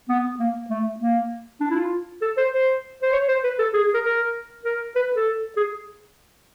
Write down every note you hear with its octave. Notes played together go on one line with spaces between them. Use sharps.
B3
A#3
A3
A#3
D4
E4
F4
A4
C5
C5
C5
C#5
C5
B4
A4
G#4
G#4
A#4
A#4
A#4
B4
A4
G#4